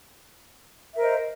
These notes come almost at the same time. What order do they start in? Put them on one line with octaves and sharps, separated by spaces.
E5 A#4 C5 D#5